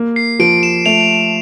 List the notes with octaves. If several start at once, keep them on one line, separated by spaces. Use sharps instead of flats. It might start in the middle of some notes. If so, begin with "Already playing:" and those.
Already playing: A#3
C7
F3 D7
E7
A3 F7